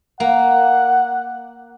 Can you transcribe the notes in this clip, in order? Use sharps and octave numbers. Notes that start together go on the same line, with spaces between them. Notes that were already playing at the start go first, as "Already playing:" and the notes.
A#3 F#5